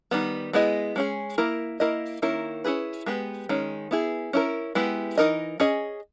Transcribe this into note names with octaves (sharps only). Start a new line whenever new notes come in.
D#3 G3 B3
G#3 B3 E4 G#4 D#5
G#3 C#4 G#4
A#3 E4 A#4
A#3 E4 A#4 D#5
D#3 A#3 C#4 E4 A#4
C#4 E4 G#4 B4
G#3 B3 G4 B4
D#3 G#3 C#4
B3 E4 G#4
C#4 E4 A#4
G#3 B3 E4 G4 B4
E3 A#3 D#4 A#4 D#5
C#4 G#4 D#5